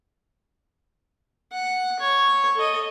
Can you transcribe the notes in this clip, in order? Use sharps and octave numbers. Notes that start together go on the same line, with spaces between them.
F#5
C#5
A4 D#5